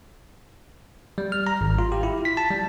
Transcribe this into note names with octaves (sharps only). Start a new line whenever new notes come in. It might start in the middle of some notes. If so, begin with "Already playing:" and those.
G3
F6
A#5
G#1
F4
G4
E4
B6
A5
G3